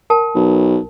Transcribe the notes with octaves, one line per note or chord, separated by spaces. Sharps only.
A#4 G5 A5
B1